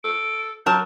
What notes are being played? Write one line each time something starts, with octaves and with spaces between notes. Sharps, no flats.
A4 D7
F#3 A#4 A5 G6